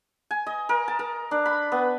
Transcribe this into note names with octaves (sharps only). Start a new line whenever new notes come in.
G#5
D#5
A#4
A5
A#4
D4
B5
B3